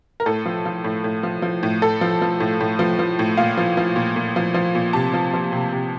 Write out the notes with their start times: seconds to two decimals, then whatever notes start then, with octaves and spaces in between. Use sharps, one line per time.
0.20 A#4
0.26 A2 A4
0.45 F3
0.65 F3
0.84 A2
1.04 A2
1.23 F3
1.42 F3
1.63 A2
1.82 A2 A4
2.01 F3
2.21 F3
2.40 A2
2.60 A2
2.79 F3
2.99 F3
3.19 A2
3.37 A#2 F5
3.57 F3
3.77 F3
3.96 A#2
4.16 A#2
4.36 F3
4.54 F3
4.75 A#2
4.93 C3 A5
5.14 F3
5.34 F3
5.52 C3
5.72 C3